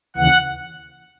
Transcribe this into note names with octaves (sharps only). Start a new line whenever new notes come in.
D#2 C#3 E3 F#5